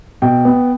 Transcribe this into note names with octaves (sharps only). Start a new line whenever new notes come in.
B2 G5
B3